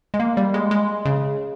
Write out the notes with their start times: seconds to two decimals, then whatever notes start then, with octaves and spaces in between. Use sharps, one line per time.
0.14 G#3
0.20 A#3
0.37 G3
0.54 G#3
0.71 G#3
1.05 C#3